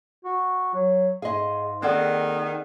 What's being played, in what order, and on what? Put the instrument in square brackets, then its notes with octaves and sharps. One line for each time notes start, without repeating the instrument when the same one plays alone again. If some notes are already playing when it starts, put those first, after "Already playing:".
[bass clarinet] F#4
F#3
[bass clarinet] G#2 [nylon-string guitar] G#4 D#5 [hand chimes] F5 C6
[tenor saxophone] D#3 [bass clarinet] A#3 [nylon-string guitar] C4 A4 D5 [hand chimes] G#4 F#5 F#6